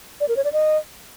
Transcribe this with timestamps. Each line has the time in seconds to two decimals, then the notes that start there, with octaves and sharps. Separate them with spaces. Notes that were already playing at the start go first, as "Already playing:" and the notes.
0.20 D5
0.28 A#4
0.37 C#5
0.45 D5
0.53 D#5